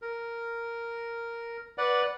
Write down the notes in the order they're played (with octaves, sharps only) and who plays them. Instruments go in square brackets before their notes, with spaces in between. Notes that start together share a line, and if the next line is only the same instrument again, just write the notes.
[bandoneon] A#4
B4 D5 F#5